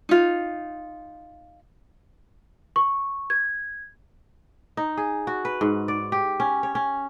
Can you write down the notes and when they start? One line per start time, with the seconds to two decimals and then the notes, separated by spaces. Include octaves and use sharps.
0.09 D#4 F4
2.76 C#6
3.30 G#6
4.77 D#4
4.97 G#4
5.27 F#4
5.45 B4
5.61 G#2
5.88 D5
6.12 G4
6.40 C#4
6.63 C#5
6.75 C#4